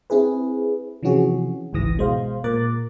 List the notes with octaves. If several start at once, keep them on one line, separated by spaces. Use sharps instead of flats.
C4 E4 G#4 B4
C3 E3 F3 C#4 F#4 G#4
G#1 C#2 G#2 E3 D#6 A#6
B2 G#3 C5 F5
A#2 A#4 D6 F#6 A6